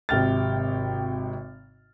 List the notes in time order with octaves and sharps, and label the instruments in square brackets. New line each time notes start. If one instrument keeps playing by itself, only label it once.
[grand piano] G#1 C3 G5 F6 A6